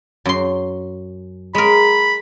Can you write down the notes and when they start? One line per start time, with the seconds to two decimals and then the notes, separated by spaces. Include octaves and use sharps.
0.25 F#2 C6
1.55 G#3 A#4 B5